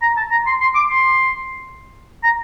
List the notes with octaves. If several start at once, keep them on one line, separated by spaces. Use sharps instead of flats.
A#5
A5
A#5
C6
C6
D6
C6
A#5